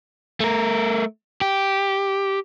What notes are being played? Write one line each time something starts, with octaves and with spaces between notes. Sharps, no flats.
A3 A#4
G4